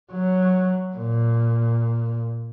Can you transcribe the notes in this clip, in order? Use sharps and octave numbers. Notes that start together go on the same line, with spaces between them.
F#3
A#2